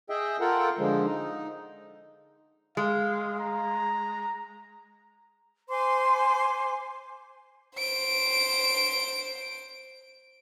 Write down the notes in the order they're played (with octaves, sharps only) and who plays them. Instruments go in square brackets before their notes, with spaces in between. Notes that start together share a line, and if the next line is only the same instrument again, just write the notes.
[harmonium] G#4 D#5 E5 G5
F4 A4 A#4 F#5 G5
D3 F3 G#3
D#4
[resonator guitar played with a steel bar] G#3 [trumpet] F5
[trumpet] A#5
[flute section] C5 G#5 C6 D6
[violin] C5 D7